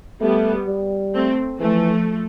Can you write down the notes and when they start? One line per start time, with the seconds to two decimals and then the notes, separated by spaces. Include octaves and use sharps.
0.21 G3 A3 B3
0.67 G3
1.14 A3 C4
1.60 E3 F3 A3